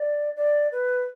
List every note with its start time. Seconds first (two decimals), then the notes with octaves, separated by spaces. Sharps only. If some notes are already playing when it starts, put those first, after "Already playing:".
Already playing: D5
0.36 D5
0.72 B4